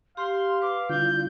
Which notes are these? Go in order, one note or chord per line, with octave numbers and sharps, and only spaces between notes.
G4 F5 C6
B4 D6
D3 G3 E4 F4 G6